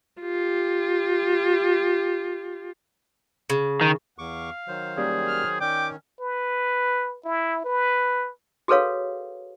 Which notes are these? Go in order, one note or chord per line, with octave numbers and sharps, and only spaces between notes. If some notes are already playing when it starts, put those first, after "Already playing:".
F4 G4
C#3
D#3
E2 F5 C#6 D6
D#3 F#3 C5
G3 A#3 C#4 G#4
F6
D#3 C#4 D5 G5 D6
B4
E4
B4
F#4 G#4 A4 B4 C#5 F5